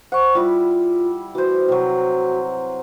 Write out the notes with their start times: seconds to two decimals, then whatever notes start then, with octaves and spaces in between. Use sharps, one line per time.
0.12 C5 F#5 C#6
0.35 G3 E4 F4
1.35 E3 F#4 C5
1.68 C3 F#3